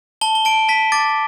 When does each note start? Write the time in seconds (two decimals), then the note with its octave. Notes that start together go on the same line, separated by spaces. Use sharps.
0.21 A5 G7
0.35 G7
0.45 A5 D7
0.69 A5 B6
0.92 D6 A6